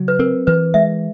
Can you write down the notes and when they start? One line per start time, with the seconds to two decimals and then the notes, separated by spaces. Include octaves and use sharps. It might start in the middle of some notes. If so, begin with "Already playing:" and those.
Already playing: C#3 F#3
0.08 B4
0.19 C4 A#4
0.47 E3 B4
0.74 G#3 E5